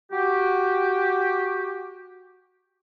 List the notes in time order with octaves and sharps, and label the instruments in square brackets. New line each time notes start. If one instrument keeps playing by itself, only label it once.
[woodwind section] F#4 G4